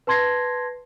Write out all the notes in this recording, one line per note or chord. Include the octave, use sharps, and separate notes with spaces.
B4 A5 C6 G#6 A#6 C7